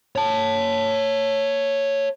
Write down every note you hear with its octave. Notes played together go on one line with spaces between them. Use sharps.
C#5 A5